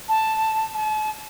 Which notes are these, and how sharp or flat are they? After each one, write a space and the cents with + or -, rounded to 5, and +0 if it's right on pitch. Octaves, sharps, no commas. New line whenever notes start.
A5 +0
A5 -40